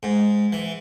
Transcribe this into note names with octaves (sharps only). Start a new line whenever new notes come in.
G#2
E3